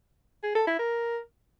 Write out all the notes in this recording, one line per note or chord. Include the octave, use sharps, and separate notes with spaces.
G#4
A4
E4
A#4